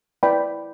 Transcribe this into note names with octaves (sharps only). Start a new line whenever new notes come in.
E4 B4 D5 G5 B5